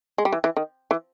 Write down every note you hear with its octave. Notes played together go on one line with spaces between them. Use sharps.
G#3
G3
E3
E3
D#3
E3